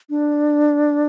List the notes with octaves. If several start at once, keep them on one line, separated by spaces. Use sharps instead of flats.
D4